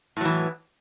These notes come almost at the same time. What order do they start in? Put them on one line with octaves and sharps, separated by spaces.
A2 F#3 E3